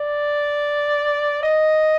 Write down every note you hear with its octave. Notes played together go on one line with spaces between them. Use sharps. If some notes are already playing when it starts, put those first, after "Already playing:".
Already playing: D5
D#5